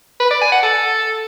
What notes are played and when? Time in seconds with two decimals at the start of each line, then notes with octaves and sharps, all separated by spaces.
0.20 B4
0.31 D5
0.41 G#5
0.52 F#5
0.63 A4